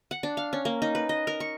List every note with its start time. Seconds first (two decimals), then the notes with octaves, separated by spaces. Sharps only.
0.11 F#5
0.23 D4
0.37 F5
0.53 C#4
0.65 A#3
0.82 D#4
0.95 B4
1.09 D#5
1.27 A#4
1.40 C#6